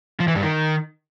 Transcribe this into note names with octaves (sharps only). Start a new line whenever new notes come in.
F3
E3
G2
D#3